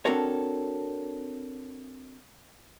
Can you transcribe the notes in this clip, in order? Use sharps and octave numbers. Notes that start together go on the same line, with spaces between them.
C4 D4 F#4 A4 A#4 C#5